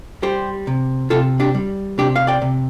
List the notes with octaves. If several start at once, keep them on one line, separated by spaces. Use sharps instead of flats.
G3 G4 C5
C3
C3 F4 A4
D4 G4
G3
C3 D4 G4
F5
D5 G5
C3